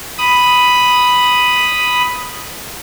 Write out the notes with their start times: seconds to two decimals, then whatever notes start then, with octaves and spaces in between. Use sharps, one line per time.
0.18 B5 D#6